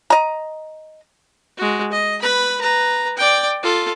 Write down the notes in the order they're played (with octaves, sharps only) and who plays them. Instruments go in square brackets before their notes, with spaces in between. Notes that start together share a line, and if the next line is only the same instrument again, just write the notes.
[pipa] D#5 A#5
[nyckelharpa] G#3 F#4
D#5
B4 B5
B4 A#5
D5 G5
F4 A4